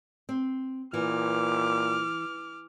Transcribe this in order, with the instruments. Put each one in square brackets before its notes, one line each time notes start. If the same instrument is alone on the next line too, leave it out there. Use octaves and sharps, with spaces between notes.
[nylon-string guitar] C4
[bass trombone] A#2 [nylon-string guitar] E3 [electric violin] D6 F6